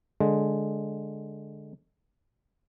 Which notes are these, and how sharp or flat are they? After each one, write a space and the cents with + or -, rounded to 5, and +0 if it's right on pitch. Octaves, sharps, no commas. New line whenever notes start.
D3 +0 G#3 +10